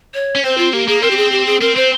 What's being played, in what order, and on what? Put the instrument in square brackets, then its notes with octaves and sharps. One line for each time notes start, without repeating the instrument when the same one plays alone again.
[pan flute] C#5
[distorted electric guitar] C#4
[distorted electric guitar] C4 [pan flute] C5
[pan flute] F4
[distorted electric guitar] A#3 [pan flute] G4
[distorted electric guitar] A#3 [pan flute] G#4
[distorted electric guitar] C4 [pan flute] A#4
[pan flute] G4
G#4
G4
G#4
[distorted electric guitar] C4 [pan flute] A#4
[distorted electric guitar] C4 [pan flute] C5